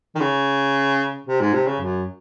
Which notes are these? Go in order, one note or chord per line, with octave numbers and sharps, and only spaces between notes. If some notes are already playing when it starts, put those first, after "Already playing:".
D#3
C#3
C3
G#2
C3
C#3
F#2